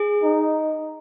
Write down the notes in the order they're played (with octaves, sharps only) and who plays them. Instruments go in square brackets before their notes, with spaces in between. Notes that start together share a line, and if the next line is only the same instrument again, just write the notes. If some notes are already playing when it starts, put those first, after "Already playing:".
Already playing: [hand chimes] G#4
[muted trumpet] D#4